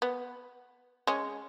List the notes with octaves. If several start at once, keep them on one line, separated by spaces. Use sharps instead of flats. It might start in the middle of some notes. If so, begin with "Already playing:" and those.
B3
G#3 C#4